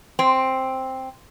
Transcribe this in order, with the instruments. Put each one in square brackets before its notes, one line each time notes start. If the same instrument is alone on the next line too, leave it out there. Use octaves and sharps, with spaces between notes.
[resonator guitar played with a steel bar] C4